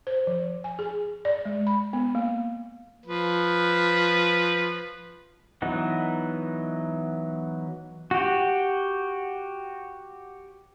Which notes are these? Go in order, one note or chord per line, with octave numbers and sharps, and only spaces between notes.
C5
F3
G#5
G#4
D5
G#3
B5
B3
A#3
F3 B4
E3 F#3 B3 D#4
F#4 G4